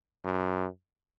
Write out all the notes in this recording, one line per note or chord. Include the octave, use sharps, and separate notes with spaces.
F#2